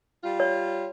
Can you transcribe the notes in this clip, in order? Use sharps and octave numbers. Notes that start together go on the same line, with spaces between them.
G3 F4
C#5